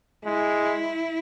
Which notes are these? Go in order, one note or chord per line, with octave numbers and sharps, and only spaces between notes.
G#3 E4